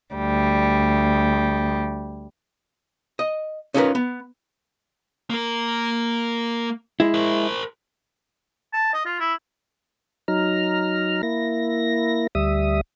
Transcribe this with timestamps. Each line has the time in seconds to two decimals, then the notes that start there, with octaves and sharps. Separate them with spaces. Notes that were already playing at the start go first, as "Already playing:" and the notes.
0.14 D2 G3
3.19 D#5
3.74 C#4 D#4 F4 G#4 A#4 B4
3.95 B3
5.30 A#3 A#4
7.00 G#3 E4
7.14 A#4 C5
8.73 A5
8.94 D#5
9.06 F4
9.20 E4
10.28 F#3 D#4 A#5 F6
11.23 A#3 E4 A#6
12.35 D2 G3 E5 D#6